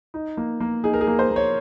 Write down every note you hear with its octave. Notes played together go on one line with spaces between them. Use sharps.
D#4
A#3
A#3
D#4 G#4
A#4
G#4
A#3
C5
A#3
C#5